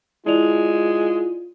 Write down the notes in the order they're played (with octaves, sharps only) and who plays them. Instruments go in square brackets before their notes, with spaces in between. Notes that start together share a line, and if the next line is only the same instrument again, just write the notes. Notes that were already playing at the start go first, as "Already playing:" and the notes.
[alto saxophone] G#3 [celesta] E4 D5 F7 [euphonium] F4